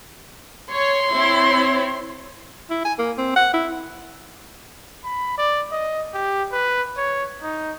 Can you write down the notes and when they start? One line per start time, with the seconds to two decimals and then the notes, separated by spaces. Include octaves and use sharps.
0.72 C#5 C6
1.13 C4 E4 C#5
2.70 E4
2.85 G#5
2.99 A#3
3.18 C4
3.36 F#5
3.54 E4
5.04 B5
5.38 D5
5.72 D#5
6.13 G4
6.52 B4
6.97 C#5
7.42 D#4